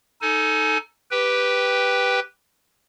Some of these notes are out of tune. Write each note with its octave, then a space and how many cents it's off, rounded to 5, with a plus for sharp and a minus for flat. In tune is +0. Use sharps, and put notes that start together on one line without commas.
D#4 +0 A4 +0 G#5 +30
G4 +0 B4 +0 G5 +0